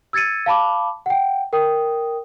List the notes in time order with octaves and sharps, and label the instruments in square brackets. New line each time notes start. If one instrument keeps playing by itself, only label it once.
[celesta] E6 G#6 A6 C#7 D#7
F5 A5 B5 D6
F#5 G5
A#4 G5 D#6